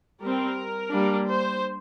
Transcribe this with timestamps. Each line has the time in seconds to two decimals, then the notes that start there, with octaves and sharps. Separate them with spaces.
0.21 G3 C4 A#4
0.91 G3 A#3 D4
1.26 C5